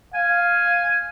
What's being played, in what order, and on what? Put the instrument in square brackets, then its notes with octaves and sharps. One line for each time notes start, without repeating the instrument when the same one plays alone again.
[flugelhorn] F5 [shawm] G#5